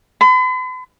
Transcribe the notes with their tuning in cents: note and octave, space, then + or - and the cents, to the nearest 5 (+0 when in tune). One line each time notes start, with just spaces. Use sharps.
B5 +45